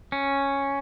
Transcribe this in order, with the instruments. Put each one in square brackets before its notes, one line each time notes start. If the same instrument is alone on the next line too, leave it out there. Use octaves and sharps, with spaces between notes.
[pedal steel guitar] C#4